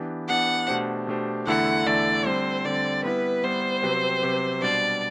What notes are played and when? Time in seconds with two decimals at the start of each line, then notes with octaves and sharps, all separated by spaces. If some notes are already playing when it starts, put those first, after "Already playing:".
Already playing: E3 B3 D4 G4
0.28 E3 B3 D4 G4 F#5
0.68 B2 A3 D4 G4 C5
1.07 B2 A3 D4 G4 C5
1.47 E2 D3 A3 E4 A4 F#5
1.86 E2 D3 A3 E4 A4 D5
2.25 D3 G3 C4 C5
2.65 D3 G3 C4 D5
3.04 G3 B3 E4 B4
3.44 G3 B3 E4 C5
3.83 C3 F#3 C4 G4 B4
4.22 C3 F#3 C4 G4 B4
4.62 B2 G3 D4 D5